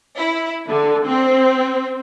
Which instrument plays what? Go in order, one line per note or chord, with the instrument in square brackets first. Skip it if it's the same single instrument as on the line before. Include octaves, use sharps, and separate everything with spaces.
[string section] E4
D3
C4